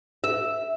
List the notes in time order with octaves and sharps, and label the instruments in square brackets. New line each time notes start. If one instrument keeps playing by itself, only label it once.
[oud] E5